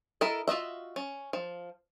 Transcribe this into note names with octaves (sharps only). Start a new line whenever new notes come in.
E4 A4 A#4 D#5
F4 F#4 D#5 E5
C#4
F3